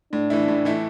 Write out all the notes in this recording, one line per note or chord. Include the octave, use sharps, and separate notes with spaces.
A2 D4
E3 A3 E4
A2
E3 A3 E4